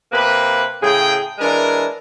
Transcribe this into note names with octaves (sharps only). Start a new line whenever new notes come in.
C3 A#3 B4
A2 C#3 G#4 G5
E3 G#3 D4 A#4